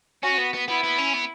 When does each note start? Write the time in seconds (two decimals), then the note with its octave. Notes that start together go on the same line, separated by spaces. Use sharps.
0.23 C#4 F#4
0.38 B3
0.54 B3
0.68 B3 E4
0.83 B3
0.98 C#4
1.14 B3